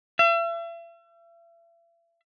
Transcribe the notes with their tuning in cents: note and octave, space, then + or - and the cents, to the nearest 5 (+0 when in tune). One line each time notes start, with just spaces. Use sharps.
E5 +40